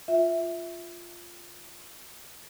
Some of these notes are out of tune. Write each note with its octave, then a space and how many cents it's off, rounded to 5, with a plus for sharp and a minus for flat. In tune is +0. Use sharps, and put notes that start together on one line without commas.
F4 +0 E5 +0